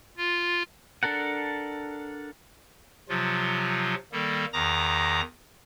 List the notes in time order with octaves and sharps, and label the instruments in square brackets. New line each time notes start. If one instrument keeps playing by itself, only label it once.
[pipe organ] F4
[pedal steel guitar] D4 A4 A#4 F#5
[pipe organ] C3 F3 F#3 F4
D#3 G3 A#3 A4
E2 D#3 A#5 D6 D#6 A#6